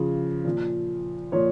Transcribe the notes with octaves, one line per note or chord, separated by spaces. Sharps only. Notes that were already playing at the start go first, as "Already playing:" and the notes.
Already playing: C#3 F3
A#2 F3
A#2 F3 C#5